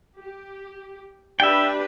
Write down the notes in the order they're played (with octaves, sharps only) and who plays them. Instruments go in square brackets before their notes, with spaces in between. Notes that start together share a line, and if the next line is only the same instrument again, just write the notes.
[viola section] G4
[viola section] D4 G4 B4 [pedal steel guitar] E5 G5